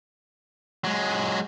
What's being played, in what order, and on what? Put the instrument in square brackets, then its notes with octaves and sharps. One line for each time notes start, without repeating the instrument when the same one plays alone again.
[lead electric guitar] F#3 G#3